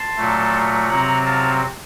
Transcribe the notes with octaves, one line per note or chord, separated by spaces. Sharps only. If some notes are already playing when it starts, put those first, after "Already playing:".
Already playing: A5 C6
A#2 F#3 A3
C3 F#3 C4 F#5 A#5
F5 A5